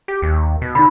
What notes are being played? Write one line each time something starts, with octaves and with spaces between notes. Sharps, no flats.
G4
D#2
B2
D3 D#4 B5